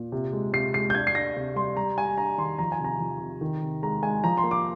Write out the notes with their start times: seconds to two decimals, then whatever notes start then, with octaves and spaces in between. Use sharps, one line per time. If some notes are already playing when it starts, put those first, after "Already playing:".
Already playing: A#2
0.12 C3
0.33 G#3
0.53 C3 C7
0.74 G#3 C7
0.90 G6
0.94 D4 G#6
1.07 C7
1.15 D4 A#6
1.36 C3
1.56 G3 C6
1.77 G3 A#5
1.97 G3 G#5
2.18 D4 A#5
2.38 D#3 C6
2.59 F3 A#5
2.72 G#5
2.79 C3
2.85 A#5
3.00 F3
3.20 C3
3.41 D#3
3.62 C3
3.83 G#3 A#5
4.02 G#3 G#5
4.24 F3 A#5
4.38 C6
4.44 A#3
4.51 D6